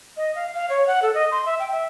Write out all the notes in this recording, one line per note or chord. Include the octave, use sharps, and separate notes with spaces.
D#5
F5
F5
C#5
F#5
A4
D#5
C6
E5
G5
E5